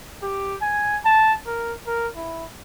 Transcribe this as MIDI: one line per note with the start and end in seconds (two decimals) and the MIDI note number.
0.23 0.56 67
0.62 0.97 80
1.05 1.33 81
1.46 1.74 70
1.87 2.08 70
2.16 2.44 64